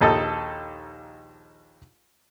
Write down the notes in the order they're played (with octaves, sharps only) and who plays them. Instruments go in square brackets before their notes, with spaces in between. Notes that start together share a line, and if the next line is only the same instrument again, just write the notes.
[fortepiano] A#1 D#2 D#4 A4